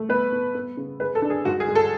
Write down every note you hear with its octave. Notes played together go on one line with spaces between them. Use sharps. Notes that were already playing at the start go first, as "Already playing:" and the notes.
Already playing: A3
B3 B4
B3
B3
C#3
G#3 B4
A4
D4
G#4
G#2 F#4
G#4
G#3
A4